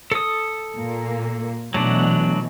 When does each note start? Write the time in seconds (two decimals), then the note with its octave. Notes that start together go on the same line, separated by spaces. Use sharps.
0.12 A4 D#6
0.77 A#2 A#3
1.74 B2 E3 F#3 A3 D4